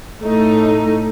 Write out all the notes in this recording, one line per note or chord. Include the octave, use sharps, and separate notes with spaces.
A2 A3 D#4